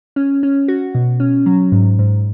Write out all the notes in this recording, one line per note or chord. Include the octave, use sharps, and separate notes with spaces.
C#4
C#4
F#4
B2
C#4
F#3
G#2
G#2